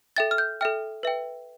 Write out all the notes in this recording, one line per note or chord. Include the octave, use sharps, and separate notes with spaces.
A4 E5 G5 A6
F6
G6
A4 E5 G5 F6
B4 E5 G5